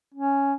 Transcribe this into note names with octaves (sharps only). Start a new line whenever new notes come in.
C#4